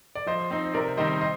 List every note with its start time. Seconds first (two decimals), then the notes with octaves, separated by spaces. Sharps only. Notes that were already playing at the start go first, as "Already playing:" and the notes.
0.15 D5
0.26 F3 C5 D#5
0.50 C4 D#4
0.74 C3 A#4 D5
0.97 D#3 G3 C4 D#4 C5 D#5
1.21 C5 D#5